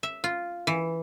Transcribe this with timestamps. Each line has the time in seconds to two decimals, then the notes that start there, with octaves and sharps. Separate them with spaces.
0.03 E5
0.24 F4
0.67 E3